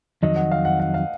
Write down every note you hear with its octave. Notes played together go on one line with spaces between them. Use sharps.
F2 D#3 F#3 D#5
F#5
F5
F#5
F#5
F5